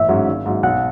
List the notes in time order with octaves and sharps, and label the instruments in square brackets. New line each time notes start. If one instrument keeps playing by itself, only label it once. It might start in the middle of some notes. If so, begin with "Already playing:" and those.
Already playing: [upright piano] A1 [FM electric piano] E5
[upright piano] G#2 F#3 C#4
G#1
G#2 F#3
[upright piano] B1 [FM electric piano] F#5